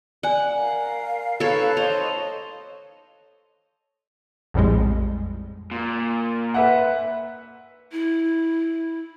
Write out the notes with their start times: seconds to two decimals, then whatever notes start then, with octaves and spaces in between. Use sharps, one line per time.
0.23 D5 F#5 G#5
0.56 A#4 F5
1.40 D#4 A4 B4 C#5
1.77 C5 C#5 D#5 F7
4.54 A#1 F2 A2 G3 G#3
5.71 A#2
6.54 B4 E5 F#5
7.92 E4